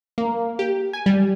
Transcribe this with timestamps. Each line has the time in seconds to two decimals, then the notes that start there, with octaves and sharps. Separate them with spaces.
0.18 A#3
0.59 G4
0.93 G#5
1.06 G3